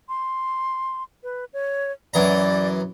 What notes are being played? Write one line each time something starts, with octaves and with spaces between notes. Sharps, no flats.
C6
B4
C#5
F#2 E3 D5 A#5